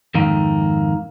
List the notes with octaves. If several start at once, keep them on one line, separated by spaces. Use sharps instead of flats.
F2 G#2 D#3 A#3